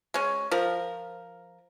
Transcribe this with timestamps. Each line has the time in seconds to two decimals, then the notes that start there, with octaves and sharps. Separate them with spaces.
0.14 G#3 C#4
0.51 F3 A#4